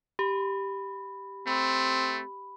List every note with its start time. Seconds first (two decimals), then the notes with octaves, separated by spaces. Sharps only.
0.19 G4 B5
1.47 A3 C4 B5